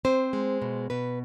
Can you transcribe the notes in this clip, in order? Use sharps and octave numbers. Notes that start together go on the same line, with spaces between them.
C4 C5
G#3
B2
B2 B4